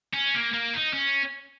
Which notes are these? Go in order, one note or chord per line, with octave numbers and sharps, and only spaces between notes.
C#4
A#3
A#3
D#4
C#4